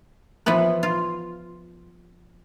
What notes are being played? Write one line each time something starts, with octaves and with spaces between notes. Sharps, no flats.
E3 F3 B3 B4
F4